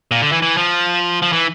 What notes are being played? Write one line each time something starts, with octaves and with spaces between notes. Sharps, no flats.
A#2
D3
E3
E3
F3
F3
E3